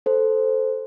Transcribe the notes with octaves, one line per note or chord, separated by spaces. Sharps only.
A4 C5